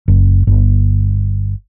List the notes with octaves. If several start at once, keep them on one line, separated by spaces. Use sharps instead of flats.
F#1
G1